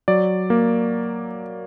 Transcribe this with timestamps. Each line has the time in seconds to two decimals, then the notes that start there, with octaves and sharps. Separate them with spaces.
0.08 F#3 D5
0.50 A#3